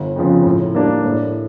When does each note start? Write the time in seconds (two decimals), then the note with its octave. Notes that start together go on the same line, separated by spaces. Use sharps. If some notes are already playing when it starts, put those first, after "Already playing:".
Already playing: G1
0.16 F2 C#3 F3
0.45 A2
0.75 G3 A#3 D4
1.05 A2